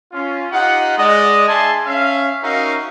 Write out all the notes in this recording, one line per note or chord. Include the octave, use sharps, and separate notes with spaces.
C#4 F4
D#4 F4 G4 F#5
G#3 D5 D#5
D4 G#4 E5 G#5 A5 C6
C#4 E5 F5
C#4 D#4 F#4 A#4 E5 F5